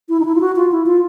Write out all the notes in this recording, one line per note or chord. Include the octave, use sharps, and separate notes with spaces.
E4
D#4
E4
F4
F#4
F4
E4
F4